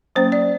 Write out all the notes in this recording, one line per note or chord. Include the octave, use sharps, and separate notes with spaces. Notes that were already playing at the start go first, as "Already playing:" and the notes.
F#3 A#3 C#4 C5
D5